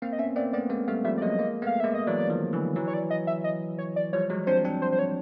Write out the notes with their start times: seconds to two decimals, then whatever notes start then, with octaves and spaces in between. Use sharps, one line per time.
0.02 A#3 C4 F5
0.13 D#5
0.19 B3 C#4 E5
0.36 A#3 C4 D5
0.53 A3 B3 D5
0.70 G#3 A#3
0.87 G3 A3 F5
1.05 F3 G3 E5
1.17 D5
1.22 F#3 G#3 D#5
1.39 G#3 A#3
1.62 A3 B3 F5
1.80 G#3 A#3 E5
1.94 D#5
2.07 E3 F#3 D5
2.30 D#3 F3
2.53 D3 E3
2.76 E3 F#3
2.88 C#5
2.94 D5
3.10 D#5
3.27 E5
3.44 D#5
3.78 C#5
3.96 D5
4.13 F3 G3 C#5
4.30 F#3 G#3
4.47 C4 D4 C5
4.65 C4 D4
4.82 C5
4.92 C5
4.99 C#5